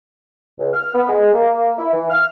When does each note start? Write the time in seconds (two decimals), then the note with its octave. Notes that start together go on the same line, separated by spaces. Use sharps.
0.59 C#2
0.73 F6
0.95 B3
1.09 G#3
1.33 A#3
1.78 E4
1.93 E3
2.10 F6